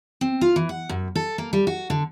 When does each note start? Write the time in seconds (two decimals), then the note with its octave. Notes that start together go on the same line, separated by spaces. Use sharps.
0.21 C4
0.41 F4
0.56 E3
0.69 F#5
0.89 F#2
1.15 A4
1.38 A#3
1.53 G3
1.67 F#4
1.90 D3